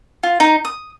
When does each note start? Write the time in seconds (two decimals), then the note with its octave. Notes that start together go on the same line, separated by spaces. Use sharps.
0.23 F4
0.40 D#4
0.65 D#6